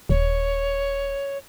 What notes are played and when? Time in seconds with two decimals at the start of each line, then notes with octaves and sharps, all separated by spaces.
0.09 D#1 C#5